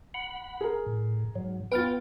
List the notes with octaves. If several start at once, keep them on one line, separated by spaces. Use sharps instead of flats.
F#5 B5
G#4 A#4
A2
G#2 F#3
B3 F4 B4 G5 F6 A6